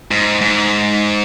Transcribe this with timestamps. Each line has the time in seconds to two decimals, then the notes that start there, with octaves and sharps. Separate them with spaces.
0.11 G#2
0.41 G#2